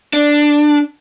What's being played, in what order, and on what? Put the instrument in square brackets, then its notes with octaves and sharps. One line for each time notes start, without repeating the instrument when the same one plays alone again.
[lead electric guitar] D4